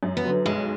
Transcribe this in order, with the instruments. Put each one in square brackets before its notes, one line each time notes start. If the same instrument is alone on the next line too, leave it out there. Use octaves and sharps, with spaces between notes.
[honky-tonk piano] F#2
[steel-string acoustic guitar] B3
[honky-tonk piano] D3 F#3
[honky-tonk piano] B1 [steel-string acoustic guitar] G#3